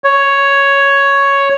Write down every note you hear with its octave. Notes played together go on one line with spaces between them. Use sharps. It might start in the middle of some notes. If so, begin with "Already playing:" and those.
C#5